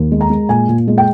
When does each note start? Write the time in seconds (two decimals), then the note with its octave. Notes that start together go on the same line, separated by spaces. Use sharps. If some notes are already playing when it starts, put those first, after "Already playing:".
Already playing: D#2
0.12 G#3
0.21 A#5
0.30 G#3
0.49 A#2 G#5
0.68 A#2
0.88 G#3
0.98 G5